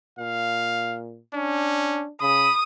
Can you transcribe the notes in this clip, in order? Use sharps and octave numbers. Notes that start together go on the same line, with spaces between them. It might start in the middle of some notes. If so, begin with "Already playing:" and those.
A#2 F5
C#4 D4
C#3 B5 D#6